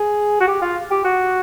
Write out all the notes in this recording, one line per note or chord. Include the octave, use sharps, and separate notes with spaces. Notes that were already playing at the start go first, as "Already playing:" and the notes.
Already playing: G#4
F#4
G4
F4
G4
F#4